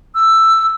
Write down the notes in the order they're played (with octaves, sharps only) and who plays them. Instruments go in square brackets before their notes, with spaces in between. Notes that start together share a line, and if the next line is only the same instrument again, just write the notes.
[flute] E6